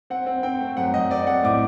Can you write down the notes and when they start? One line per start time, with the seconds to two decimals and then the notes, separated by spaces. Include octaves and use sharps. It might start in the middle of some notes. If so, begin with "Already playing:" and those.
0.10 C4 F#5
0.27 C4
0.43 C4 G5
0.60 A3
0.77 F#2 F#5
0.94 F#2 D#5
1.11 C4 D5
1.27 A3 F#5
1.44 A2 D6